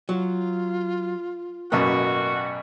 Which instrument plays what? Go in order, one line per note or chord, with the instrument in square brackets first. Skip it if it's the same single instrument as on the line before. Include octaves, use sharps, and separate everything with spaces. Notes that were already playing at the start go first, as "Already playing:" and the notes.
[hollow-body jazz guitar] F#3 [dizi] F4
[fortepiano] A1 F#2 B2 [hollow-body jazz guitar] A#3 [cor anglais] F#4